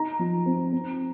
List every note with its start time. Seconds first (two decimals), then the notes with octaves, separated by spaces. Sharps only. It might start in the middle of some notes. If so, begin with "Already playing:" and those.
Already playing: D#4 A#5
0.19 F3
0.46 C4
0.72 C4